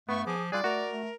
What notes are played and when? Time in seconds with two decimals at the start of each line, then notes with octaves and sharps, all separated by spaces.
0.09 G2 A3 B3 C#6
0.26 F3 G#4 D6
0.52 G3 F4 G#4 D5 F#6
0.64 A3 F#4 A#4
0.92 A3